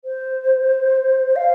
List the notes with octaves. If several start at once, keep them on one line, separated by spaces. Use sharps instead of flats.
C5
F5